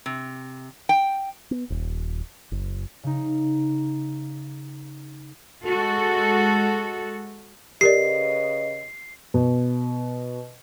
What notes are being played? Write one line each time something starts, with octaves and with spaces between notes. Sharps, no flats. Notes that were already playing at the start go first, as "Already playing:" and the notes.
C3
G5
B3
D#1
F#1
C#3 D#4
G#3 F#4 A4
C#3 G4 A#4 B4 D5 D#5 C7
B2